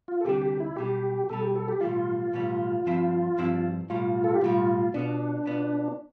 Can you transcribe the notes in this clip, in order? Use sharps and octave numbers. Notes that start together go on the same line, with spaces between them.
F4
A4
D2 C3 G3 D4 G4
G4
E4
B1 B2 G3 G4
B1 B2 G3 A4
G4
A4
G4
B1 A2 E3 G3 F4
B1 A2 E3 G3
G2 F3 C4 E4
G2 F3 C4 E4
B1 A2 G3 F4
A4
G4
B1 A2 G3 F4
B2 B3 D4 F4
B2 B3 F4